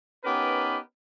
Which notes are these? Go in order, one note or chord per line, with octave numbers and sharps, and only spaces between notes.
B3 C#4 D#4 G4 A#4 B4